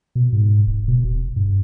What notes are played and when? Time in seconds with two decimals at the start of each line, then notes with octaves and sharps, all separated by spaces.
0.15 B2
0.32 G#2
0.67 D1
0.88 B2
1.04 E1
1.36 G2